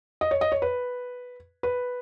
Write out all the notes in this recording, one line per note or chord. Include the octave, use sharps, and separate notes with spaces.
D#5
C#5
D#5
C#5
B4
B4